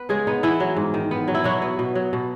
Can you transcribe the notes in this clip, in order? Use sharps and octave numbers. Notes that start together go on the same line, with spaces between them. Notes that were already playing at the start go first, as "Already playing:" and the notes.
Already playing: B3 B4
C#3 G#3 G#4
B3 D#4
E3 B3 E4
F#3
G#2
D#3
B3
F#3
E4
B2 F#3 F#4
B3
B2
F#3
B2